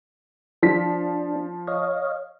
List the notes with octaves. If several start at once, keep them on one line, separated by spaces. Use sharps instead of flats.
F3 D4 B6
C#5 D#5 F5